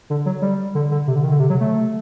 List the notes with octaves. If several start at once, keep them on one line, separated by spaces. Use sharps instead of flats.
D3
F#3
G3
D3
D3
C3
D3
D#3
D3
C3
F#3
A3